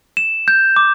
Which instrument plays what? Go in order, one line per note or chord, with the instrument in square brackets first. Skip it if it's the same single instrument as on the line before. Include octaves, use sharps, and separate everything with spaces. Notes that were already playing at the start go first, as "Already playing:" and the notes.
[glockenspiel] E7
G6
D6